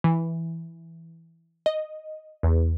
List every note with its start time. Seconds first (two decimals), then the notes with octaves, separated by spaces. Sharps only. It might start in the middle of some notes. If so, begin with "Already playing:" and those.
0.04 E3
1.66 D#5
2.43 E2